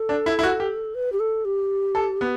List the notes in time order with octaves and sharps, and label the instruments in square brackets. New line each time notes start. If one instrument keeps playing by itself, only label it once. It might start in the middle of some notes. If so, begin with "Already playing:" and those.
Already playing: [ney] A4
[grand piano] D4
E4
E4
F#4
G4
[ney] B4
G4
A4
G4
[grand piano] A4
B3